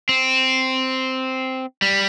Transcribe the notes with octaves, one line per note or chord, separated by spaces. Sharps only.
C4
G3